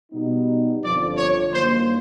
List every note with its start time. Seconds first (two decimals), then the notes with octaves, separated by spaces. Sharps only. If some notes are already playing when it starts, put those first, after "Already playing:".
0.12 B2 G3 B3 D#4
0.82 G1 F2 D3 F3 D5
1.17 C#5
1.52 G1 G2 D#3 F#3 A#3 C5